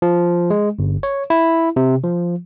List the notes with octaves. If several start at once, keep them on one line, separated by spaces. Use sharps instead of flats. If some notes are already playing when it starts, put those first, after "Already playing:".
F3
G#3
G1
C#5
E4
C3
F3